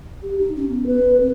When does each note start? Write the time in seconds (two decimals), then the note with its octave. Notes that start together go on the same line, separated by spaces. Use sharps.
0.22 G4
0.39 D#4
0.56 C#4
0.69 B3
0.86 B4
1.20 C4